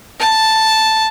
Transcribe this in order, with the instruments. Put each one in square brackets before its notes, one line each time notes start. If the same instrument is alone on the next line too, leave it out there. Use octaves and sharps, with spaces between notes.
[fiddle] A5